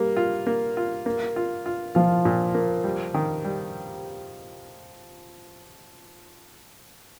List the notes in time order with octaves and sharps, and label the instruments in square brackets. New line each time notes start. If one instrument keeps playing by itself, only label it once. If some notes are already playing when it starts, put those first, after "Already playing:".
Already playing: [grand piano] G3 [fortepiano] A#3
[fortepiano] F4
A#3
F4
A#3
F4
F4
[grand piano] F3 [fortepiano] F4
[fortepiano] A#2
A#3
G3
D#3
G3